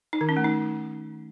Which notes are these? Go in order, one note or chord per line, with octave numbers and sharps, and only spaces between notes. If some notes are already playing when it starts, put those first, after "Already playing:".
D#4
D#3
C#4
A3
D#4